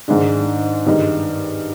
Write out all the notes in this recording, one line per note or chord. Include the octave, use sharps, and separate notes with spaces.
G#2 D#3 G#3 D4
G2 D#3 G#3 D#4